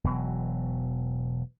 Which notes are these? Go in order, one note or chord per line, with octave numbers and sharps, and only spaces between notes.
E1 B2 E3 F#3